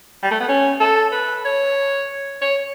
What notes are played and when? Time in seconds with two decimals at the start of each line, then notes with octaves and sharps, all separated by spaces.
0.23 G3
0.31 A3
0.40 B3
0.48 C#4
0.80 A4
1.12 B4
1.45 C#5
2.42 C#5